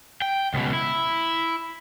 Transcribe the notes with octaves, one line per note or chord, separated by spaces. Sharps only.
G5
C#2 B2
E4